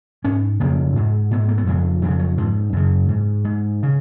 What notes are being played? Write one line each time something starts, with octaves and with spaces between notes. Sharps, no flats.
G#2 C#4
F2 C#3 A#3
G#2
G#2 B3
A#3
B3
F2 C#3 G#3
F2 C#3 F#3 G#3
F#3
G#2 F3
F#2 C#3
G#2
G#2
C#3